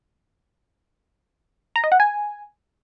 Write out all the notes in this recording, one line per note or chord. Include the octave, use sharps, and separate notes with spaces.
A#5
D#5
F#5
G#5